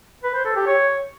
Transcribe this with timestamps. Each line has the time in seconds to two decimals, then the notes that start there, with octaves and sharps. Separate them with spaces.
0.23 B4
0.34 C5
0.45 A4
0.56 G4
0.67 C#5